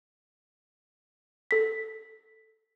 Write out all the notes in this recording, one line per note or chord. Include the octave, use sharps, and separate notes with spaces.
A4 B6